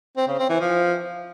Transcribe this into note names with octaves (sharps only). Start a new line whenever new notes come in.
C4
C#3
C4
E3
F3